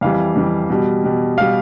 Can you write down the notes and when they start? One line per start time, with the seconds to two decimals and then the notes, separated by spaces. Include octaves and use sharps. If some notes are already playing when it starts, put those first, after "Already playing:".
0.01 F2 E3 G3 F5
0.36 F2 E3 G3
0.70 B2 G3
1.04 B2 G3
1.38 B2 G3 F5